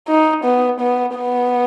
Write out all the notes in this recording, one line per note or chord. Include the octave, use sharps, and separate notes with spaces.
D#4
B3
B3
B3